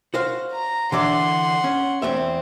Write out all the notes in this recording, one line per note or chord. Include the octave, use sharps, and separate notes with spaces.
F#4 C5 F5
A#5
D3 E3 D5 F#5 C6
C#4
E2 A3 C4 E5